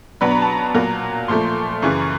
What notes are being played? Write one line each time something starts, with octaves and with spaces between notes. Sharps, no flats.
B2 F#3 B3 D4 B5
A#5
A5
A#5
A#2 F#3 A#3
A#2 F3 A3 C6
F#2 C#3 E3 C#6